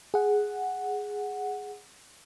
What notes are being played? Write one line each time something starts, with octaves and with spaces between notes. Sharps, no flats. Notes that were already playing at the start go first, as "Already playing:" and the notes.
G#4 F#5